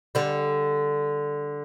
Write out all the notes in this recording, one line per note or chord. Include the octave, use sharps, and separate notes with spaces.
D3 G3